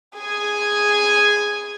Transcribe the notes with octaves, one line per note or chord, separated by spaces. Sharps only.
G#4 G#5